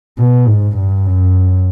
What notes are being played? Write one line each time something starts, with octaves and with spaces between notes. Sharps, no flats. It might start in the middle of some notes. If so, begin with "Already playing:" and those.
B2
G#2
G2
F#2